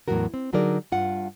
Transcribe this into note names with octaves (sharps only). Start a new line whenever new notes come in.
E2 A2 C3 F#3 F#4 A#4
C4
D3 F#3 D#4 G#4 A#4 D5
G2 F4 F#5